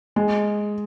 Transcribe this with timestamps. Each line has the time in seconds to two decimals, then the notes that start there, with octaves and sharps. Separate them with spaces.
0.16 G#3